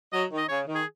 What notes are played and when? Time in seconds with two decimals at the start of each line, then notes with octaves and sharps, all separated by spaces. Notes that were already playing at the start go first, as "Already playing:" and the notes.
0.13 F#3 D#5
0.31 D#3
0.38 D#5
0.49 C#3 C#5
0.67 D#3
0.75 G#4